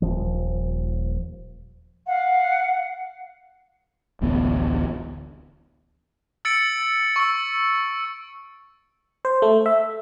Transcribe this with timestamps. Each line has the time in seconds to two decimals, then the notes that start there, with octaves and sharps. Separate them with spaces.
0.02 D#1 G#1 F3
2.06 F5 F#5
4.21 D1 A1 D2 B3
6.45 E6 A6 C#7 D7
7.16 C#6 E6
9.25 C5
9.42 A3
9.66 E5